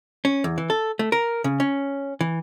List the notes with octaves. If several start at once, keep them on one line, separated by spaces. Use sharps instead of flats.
C#4
E2
E3
A4
A3
A#4
C#3
C#4
E3